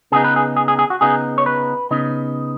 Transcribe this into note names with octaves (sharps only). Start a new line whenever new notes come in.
C#3 B3 D#4 G#4
B4
G#4
G#4
G#4
G#4
F#4
C#3 B3 D#4 G#4
C#5
B4
C#3 B3 D#4